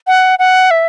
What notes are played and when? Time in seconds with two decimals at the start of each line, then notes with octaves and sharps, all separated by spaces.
0.07 F#5
0.39 F#5
0.71 E5